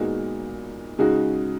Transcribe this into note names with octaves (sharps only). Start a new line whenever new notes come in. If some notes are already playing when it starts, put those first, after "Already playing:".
Already playing: A#2 G#3 B3 D#4 F#4
C#3 G#3 D#4 F#4